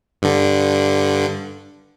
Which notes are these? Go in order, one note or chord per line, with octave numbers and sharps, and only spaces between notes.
G2 D3